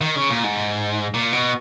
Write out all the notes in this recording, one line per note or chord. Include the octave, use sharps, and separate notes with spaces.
D#3
C#3
A#2
G#2
A#2
B2